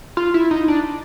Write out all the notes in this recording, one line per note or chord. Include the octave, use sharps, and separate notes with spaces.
F4
E4
D#4
D4